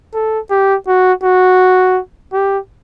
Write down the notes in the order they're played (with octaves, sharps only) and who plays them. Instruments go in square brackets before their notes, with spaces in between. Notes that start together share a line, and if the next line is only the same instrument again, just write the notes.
[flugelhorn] A4
G4
F#4
F#4
G4